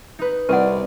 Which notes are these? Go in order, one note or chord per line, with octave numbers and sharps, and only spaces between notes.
D#4 B4
C2 B4 D5 D#5 F#5